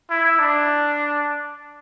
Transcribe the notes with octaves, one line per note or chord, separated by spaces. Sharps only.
E4
D4